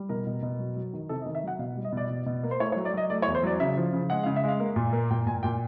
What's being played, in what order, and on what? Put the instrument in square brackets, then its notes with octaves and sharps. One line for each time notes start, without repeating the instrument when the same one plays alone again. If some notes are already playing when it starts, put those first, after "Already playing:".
Already playing: [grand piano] G3
B2 A#4
B2
B2
F#3
F#3
D#3
C3 A4
D#5
D#3
E5
F#3 F#5
B2 F5
G3
D#5
B2 D5
B2
B2
A#3
C5
A3 C#5
C#5
F#3
D5
F#3 D#5
A3 D5
C#5
E2
C5
F#3 D5
C#3 E5
F3
C#3
G#3 F#5
C#3 F5
E5
G#3 F5
A#3
A#2
A#3
A#2 G5
A#2 G#5
A#2 G5